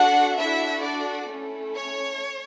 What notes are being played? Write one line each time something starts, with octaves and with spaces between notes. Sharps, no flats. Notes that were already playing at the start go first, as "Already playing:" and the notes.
Already playing: D4 F#4 A4 F#5
D4 E4 F#4 A4 E5
D4 D5
A3 C#4 E4 A4
C#5